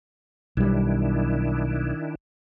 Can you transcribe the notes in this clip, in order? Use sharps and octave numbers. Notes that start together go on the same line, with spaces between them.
B1 D#3 G3 D4 E4